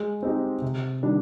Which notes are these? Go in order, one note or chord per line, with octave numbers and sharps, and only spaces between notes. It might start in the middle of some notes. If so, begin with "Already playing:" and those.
Already playing: G#3
C4 D#4 G4
C3
D#3 G3 D4